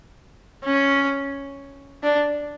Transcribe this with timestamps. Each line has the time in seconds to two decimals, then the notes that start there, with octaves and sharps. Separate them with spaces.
0.65 C#4
2.03 D4